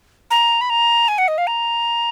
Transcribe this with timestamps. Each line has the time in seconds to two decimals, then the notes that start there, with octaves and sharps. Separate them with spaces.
0.30 A#5
0.61 B5
0.70 A#5
1.08 G#5
1.18 F#5
1.28 D#5
1.38 F5
1.47 A#5